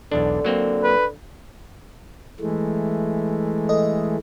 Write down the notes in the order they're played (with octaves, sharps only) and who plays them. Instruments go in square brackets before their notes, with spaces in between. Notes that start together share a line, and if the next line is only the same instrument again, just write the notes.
[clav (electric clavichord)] B1 E2 D4 [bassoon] D3
[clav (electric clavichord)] F#3 A#3 C4
[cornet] B4
[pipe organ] E3 G#3 A3
[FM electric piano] A4 D#5